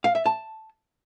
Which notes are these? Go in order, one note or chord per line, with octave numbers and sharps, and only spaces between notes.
F5
E5
A5